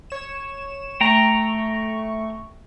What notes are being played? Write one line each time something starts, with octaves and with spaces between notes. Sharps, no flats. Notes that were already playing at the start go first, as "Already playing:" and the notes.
C#5 E7
A3 G5 A#5 C#6